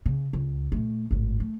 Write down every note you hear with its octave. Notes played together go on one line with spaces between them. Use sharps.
C#3
C#2
A#2 A3
G#1 A2
A3